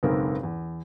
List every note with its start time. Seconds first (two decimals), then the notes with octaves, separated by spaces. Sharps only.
0.03 F#1 B1 G#2 B3 C4 A#4
0.43 E2